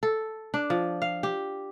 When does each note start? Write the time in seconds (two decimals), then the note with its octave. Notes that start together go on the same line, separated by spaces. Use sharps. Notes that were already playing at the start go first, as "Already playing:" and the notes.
0.03 A4
0.54 D4
0.70 F3
1.02 F5
1.23 G4